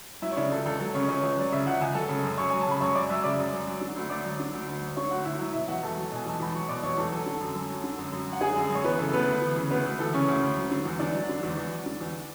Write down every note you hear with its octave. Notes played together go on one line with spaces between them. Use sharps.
F#3 E4 E5
C#5
C#3 D4 D5
C#2 A4
C#2 A4
F#3 A4
C#3 C#4 C#5
C#2 C#4 C#5
C#2
F#3 D5
C#3 E5
C#2 F#5
C#2 G#5
F#3 A4 A5
C#3
F#2
F#2 C#5 C#6
F#3 G#5
A5
C#3 B5
F#2 C#5 C#6
F#2 D5 D6
F#3 E5 E6
C#3 D5 D6
F#2
F#2
F#3
D3
D2
D2 D5 D6
F#3
D3
D2
D2
F#3
D3 C#5 C#6
D2 F#4 F#5
D2 E4 E5
F#3 E4 E5
B2 E4 E5
E2 F#4 F#5
E2 A4 A5
F#3
B2 G#5
E2 A5
E2 B5
F#3 C#6
B2 D5 D6
E2 C#5 C#6
E2 A4 A5
F#3 A4 A5
D3
F#2
F#2
F#3
D3
F#2
F#2
F#3
F#5
D3 G#4 G#5
F#2
F#2
C#5
E3 B3 B4
C#3 A4
A4
D2 B3 B4
D2
E3
C#3
D2 B3 B4
D2
E3 A4
C#3 C#4 C#5
D2
D2
F#3
D3
E2
E2 D4 D5
F#3
D3
E2
E2
F#3
D3
E2